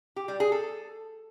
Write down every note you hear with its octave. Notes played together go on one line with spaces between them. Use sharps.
G4
G3
G#4
A4